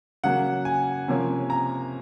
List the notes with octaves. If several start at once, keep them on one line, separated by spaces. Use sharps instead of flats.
C#3 F#3 A#3 F#5
G#5
C3 F3 A#3 C#4
A#5